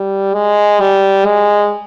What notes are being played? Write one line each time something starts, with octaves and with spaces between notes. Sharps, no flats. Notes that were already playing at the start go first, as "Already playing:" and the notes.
Already playing: G3
G#3
G3
G#3